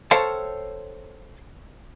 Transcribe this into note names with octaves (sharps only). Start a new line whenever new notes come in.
A4 C5 C#5 F5 G5 A5